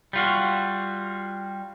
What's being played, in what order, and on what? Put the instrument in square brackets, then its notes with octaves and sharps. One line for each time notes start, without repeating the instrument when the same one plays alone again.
[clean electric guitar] G3 F4 F#4